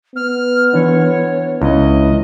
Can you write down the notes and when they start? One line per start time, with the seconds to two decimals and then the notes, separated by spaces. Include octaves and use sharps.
0.15 B3 F6
0.73 E3 D4 C#5
1.62 C#2 E4 D#5